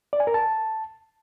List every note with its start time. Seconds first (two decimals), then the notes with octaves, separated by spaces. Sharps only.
0.13 D5
0.20 G#5
0.27 A#4
0.34 A5